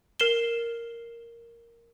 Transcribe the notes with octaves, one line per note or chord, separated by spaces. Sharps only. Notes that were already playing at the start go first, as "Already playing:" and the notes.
A#4 C7 E7 G7